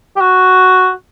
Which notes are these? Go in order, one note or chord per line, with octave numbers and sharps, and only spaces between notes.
G4
F#4